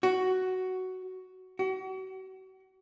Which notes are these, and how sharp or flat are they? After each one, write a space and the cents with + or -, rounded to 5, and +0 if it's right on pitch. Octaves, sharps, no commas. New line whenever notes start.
F#4 +10
F#4 +40